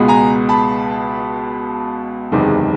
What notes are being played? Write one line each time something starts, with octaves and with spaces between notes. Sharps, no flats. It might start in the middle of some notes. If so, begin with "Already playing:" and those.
Already playing: C#2 B2 G#3 B3
G#5 A#5
A5 B5
F#1 E2 C3 D#3 G#3